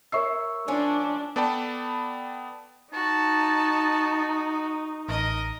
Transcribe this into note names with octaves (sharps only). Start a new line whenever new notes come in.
A#4 C#5 E5 C#6 E6 C7
F3 C#4 D4
B3 A4 D5 G5 A5 B5
D#4 F#4 A5
A1 A#4 D#5